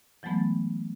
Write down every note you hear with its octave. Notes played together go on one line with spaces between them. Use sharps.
E3 F#3 G#3 A3 B3